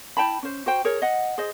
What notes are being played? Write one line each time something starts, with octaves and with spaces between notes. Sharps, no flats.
E4 G5 A5 B5
C#4 C5
F#4 C5 G5
G#4 A#4 C#5
D#5 F#5
G#4 C5 D#5